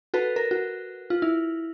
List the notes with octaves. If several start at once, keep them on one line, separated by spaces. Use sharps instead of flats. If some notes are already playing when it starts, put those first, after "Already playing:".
F#4 A4 B4
A#4
F#4
F4
E4